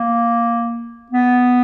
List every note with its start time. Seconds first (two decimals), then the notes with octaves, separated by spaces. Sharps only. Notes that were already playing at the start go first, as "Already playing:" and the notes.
Already playing: A#3
1.11 B3